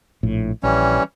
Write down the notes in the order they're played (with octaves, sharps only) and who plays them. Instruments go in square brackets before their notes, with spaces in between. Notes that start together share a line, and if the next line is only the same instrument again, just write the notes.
[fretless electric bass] A#1 A2
[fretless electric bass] A#1 [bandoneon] E3 G3 C#4